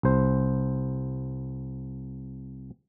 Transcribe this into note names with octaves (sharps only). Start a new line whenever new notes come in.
C2 C5